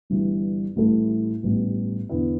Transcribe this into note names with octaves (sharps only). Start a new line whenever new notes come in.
G1 G2 E3 G3
A1 A2 G3 E4 A4
A1 G2 G3 B3
E2 D3 B3 E4